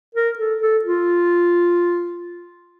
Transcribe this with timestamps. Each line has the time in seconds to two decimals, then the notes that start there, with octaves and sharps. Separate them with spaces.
0.15 A#4
0.39 A4
0.62 A4
0.84 F4